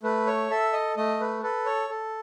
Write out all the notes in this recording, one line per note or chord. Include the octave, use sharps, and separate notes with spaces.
A3 B4
C#5
A4 E5
D#5
A3 D#5
B4
A4 B4
C#5
A4